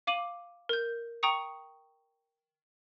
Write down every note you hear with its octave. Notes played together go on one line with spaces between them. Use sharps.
F5 D6 D#7 F#7
A#4 G6
G5 A#5 C#6 D#6 C#7